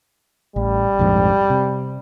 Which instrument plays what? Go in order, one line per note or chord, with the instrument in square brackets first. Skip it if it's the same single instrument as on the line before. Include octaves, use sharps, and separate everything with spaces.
[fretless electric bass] A1 [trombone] G3
[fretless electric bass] A#1 F2 G#2
C3